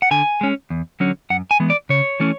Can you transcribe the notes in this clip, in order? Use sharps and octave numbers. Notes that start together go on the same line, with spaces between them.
F#5
D3 G#5
G#3 C#4
E2
D3 F#3 C#4
F#2 F#5
G#5
E3 G#3 B3
D5
C#3 C#5
E3 A3 C#4